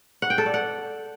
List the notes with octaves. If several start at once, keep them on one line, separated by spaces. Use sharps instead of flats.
F#5
G5
A4
D5
F#5